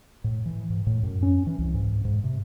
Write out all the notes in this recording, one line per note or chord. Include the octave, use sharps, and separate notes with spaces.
A2
E3
G#2
A2
F#2
C#4
E3
C2
G#2
G#2
C3